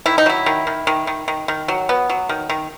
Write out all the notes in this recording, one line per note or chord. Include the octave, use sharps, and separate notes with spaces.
D#3 E4
D#4
F#3 E4
D#3
D#3
D#3
D#3
D#3
D#3
F#3
B3
F#3
D#3
D#3